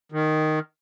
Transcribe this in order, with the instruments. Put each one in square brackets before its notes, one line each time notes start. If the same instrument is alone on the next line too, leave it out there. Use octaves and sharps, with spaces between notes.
[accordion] D#3